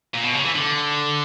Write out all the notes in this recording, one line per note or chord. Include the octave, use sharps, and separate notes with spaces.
A#2
B2
C#3
E3
D3